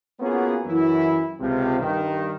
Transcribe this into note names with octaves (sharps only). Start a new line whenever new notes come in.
A#3 B3 C#4 F4 F#4 G#4
F#2 E3 E4
C#2 C3 F3
G2 D#3